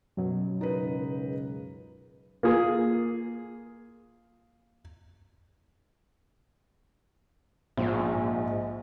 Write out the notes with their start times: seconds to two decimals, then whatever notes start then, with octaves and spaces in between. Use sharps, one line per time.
0.17 F#2 B2 F#3
0.61 C#2 D#4 A#4 B4
2.43 A#3 F4 G#4
7.77 A#1 G#2